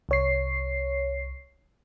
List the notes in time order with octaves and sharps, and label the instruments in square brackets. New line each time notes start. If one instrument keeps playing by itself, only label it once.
[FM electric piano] C2 C#5 C7